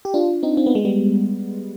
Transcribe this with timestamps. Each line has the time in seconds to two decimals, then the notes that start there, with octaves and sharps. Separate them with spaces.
0.05 G4
0.14 D4 F4
0.43 C4 D#4
0.57 C4
0.66 B3
0.75 G#3
0.85 G3 B3